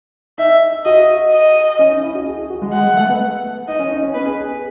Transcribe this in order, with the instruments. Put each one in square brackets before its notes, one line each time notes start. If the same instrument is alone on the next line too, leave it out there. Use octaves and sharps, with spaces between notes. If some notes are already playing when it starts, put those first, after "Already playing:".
[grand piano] D#4 [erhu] E5
[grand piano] F#4 [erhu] D#5
[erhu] D#5
[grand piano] C#4
D#4
E4
F#4
G#4
G#4
F#4
G#3
[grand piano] G#3 [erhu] F#5
[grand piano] G#3
A3
B3
[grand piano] D#4 [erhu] D#5
[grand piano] C#4
D#4
C#4
[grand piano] B3 [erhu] B4
[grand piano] G#4
G#4